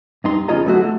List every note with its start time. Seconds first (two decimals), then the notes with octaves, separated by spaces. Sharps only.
0.24 G2 D#4 C6
0.48 E2 C#3 F4 C#5 D#5 A#5
0.66 D3 F#3 A3 F#4 C6
0.84 A3